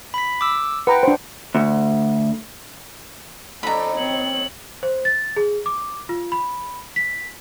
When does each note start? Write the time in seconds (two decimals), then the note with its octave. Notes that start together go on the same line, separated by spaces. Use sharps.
0.14 B5 B6
0.41 D6 E6
0.87 B4 F#5 G5 A#5
1.03 D4 C5
1.55 D2
3.63 F2 C#4 D#4 A4 D5 A#5 B5
3.97 C4 C#5 F#7
4.83 C5
5.05 A6
5.36 G#4
5.66 D6
6.09 F4
6.32 B5
6.96 B6